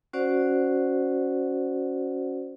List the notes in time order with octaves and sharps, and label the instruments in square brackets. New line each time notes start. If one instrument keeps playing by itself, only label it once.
[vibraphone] C#4 F#4 C5 D5 F#5